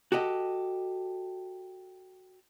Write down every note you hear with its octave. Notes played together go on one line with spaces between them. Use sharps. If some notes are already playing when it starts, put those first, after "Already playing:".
F#4 G4 A4 D#5